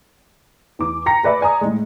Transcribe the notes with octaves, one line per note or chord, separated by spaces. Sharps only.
E2 D6
G5 A#5 A#6 C#7
G#4 B4 D5 E5 B5
D5 G#5 A#5 D#6
A2 G#3